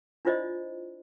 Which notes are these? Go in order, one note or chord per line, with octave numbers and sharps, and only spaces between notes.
D4 E4 F4 C5 D5 D#5